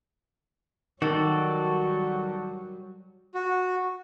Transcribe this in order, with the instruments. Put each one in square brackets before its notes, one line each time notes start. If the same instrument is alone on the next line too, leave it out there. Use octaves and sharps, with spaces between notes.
[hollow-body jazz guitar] D#3 [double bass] F#3 G3 [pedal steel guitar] F#4 A4 D5
[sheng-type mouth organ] F#4